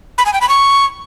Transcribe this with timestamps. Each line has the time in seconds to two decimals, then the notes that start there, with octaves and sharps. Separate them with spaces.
0.18 B5
0.26 G#5
0.33 G5
0.41 B5
0.49 C#6